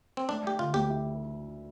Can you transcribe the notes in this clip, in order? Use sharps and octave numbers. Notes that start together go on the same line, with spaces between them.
C4
A3 D4
A3 G4
D3 F4
D2 G4
E4